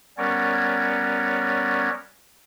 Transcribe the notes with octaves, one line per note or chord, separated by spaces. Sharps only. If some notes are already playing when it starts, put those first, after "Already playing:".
G3 B3 C#4 A#4 C#5 D5